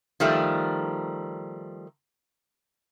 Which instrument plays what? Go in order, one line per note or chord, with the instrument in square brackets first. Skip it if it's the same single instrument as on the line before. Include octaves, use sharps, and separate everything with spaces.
[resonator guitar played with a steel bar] D#3 F3 G3 A3